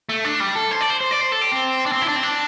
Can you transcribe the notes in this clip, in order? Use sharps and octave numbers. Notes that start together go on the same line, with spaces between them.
A3
D4
G3
A4
C5
D5
C5
C5
D5
C5
A4
G4
C4
D4
C4
E4
D4
C4
D4